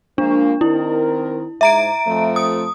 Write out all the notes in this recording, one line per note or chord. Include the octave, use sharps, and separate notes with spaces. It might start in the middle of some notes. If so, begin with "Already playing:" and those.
F3 G#3 A#3 D4
D#3 C4 E4 A#4
G#2 E5 A#5 D7
F2 F3 A3
D#6